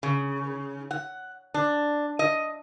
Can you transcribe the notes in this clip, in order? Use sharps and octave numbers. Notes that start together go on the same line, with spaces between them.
C#3
F#5
D4
D#5